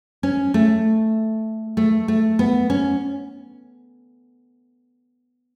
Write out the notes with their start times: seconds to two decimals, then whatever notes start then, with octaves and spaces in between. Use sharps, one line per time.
0.23 C#4
0.54 A3
1.77 A3
2.08 A3
2.39 B3
2.70 C#4